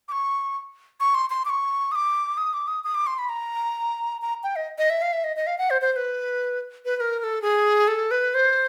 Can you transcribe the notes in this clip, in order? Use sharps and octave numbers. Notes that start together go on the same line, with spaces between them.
D6
C#6
C#6
C6
C6
D6
C#6
D#6
D6
D#6
D6
D#6
D#6
D6
C6
B5
A#5
A#5
G5
D#5
D#5
E5
F5
E5
D#5
D#5
F5
F#5
C5
C5
C5
B4
B4
B4
A#4
A#4
A4
G#4
A4
B4
C5